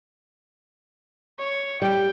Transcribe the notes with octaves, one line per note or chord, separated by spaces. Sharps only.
C#5
G3 G5